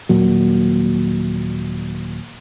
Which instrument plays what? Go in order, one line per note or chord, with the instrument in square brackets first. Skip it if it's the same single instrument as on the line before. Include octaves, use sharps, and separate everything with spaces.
[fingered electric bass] D#1 A#2 F#3